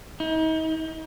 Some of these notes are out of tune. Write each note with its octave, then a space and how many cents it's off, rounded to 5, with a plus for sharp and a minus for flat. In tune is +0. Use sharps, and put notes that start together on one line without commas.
D#4 +40